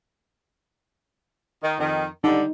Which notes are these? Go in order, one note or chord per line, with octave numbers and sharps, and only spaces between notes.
D#3
F2 D#3
D3 G3 D#4